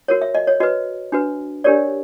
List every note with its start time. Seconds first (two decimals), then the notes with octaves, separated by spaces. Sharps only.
0.08 F#4 A#4 C#5
0.22 E5
0.35 D#5
0.47 C#5
0.60 F#4 B4 D#5
1.12 D4 F#4 B4
1.64 D4 G4 A#4 C#5 D5